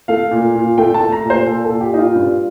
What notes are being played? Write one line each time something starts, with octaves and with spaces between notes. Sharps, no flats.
A3 F5
A#2
A#2
A3 G5
A5
A3
A#5
A#2
C5
A#2 A4
A#2 A4
G4
A#2 D#4
F4
G2